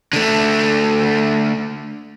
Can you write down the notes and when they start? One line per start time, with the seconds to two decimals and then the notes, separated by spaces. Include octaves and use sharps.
0.13 D3 A3